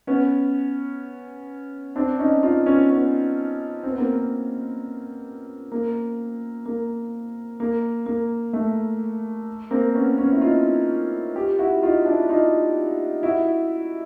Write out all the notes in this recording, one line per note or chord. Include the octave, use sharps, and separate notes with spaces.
B3 C#4
C4 D4
C#4 D#4
D#4 F4
B3 C#4
B3 C#4
C4
B3
A#3 C4
A#3
A#3
A#3
A#3
A3
A#3 C4
B3 C#4
B3 C#4
E4
D#4 F4
F4 G4
E4 F#4
D#4 F4
D4 E4
D#4 F4
E4 F#4